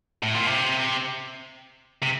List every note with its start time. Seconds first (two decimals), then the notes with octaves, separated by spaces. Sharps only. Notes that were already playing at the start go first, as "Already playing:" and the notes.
0.23 A2
0.34 A#2
0.47 C3
2.03 C3